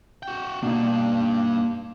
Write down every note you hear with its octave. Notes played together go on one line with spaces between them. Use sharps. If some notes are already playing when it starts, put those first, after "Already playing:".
F#4 G5
G2 B2 A#3 D4 D#4